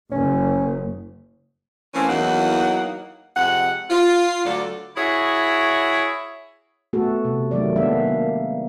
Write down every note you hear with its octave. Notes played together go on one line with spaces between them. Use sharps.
F#1 C#4
E3 A3 A#3 C4 C#4
E2 E3 F#3 A#3 D#4 F#5
F2 C3 G#3 F#5
F4
D2 F#3 D4 A4 D5
E4 F#4 G#4 C#5 E5
A3 B3 F#4 A4
C3
D#3 F#3 A3 D5
G#3 A#3 B3 D4 E5 F5
A#3